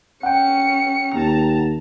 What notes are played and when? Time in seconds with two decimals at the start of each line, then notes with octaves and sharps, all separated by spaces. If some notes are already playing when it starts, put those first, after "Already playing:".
0.23 C#4 F#5 G5 C#7
1.14 D#2 A5 A#5